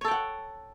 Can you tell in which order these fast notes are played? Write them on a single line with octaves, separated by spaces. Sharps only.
C#5 A4 G5 F#5